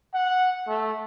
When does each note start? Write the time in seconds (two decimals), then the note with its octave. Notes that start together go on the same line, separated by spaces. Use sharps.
0.14 F#5
0.68 A3